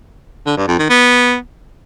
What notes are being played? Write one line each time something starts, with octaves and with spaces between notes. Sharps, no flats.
D3
G2
F2
D#3
B3